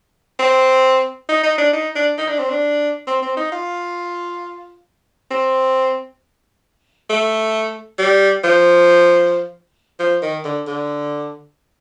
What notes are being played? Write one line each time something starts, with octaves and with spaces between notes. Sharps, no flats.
C4
D#4
D#4
D4
D#4
D4
D#4
D4
C4
D4
C4
C4
D#4
F4
C4
A3
G3
F3
F3
D#3
D3
D3